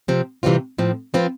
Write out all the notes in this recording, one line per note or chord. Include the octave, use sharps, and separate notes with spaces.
C3 F3 C4
C3 E3 G3 C4 F4
A2 F3 C4
F3 C4 F4 B4